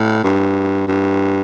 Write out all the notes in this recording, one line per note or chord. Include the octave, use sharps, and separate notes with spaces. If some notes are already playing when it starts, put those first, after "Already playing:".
Already playing: A2
G2
G2